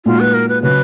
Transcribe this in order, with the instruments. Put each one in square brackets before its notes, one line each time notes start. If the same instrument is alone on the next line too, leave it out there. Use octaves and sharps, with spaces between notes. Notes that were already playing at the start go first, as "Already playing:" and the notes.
[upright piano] A#2 G#3 D#4 F#4 [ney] F4
[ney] B4
A#4
B4
[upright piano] C#3 F#3 [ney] B4